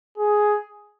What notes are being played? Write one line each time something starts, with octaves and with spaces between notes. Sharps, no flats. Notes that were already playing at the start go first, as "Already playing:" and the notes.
G#4